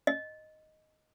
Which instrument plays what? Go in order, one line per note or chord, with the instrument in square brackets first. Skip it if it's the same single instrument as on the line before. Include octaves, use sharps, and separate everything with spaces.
[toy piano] D#5